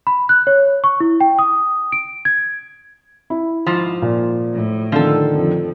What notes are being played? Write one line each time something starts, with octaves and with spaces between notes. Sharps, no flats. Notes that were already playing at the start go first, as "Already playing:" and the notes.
B5
F#6
C#5
C#6
E4
G5
D#6
D7
G#6
E4
G#2 F3
A#2
A2
D3 D#3 F3 A4
F2